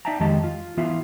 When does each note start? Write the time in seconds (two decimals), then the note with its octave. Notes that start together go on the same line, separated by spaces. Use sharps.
0.05 D#4 D5 E5 G5 A5 A#5
0.20 F2 D#3 G#3 G4 D#5 A5
0.44 F4
0.77 E3 B3 E4 F4 E5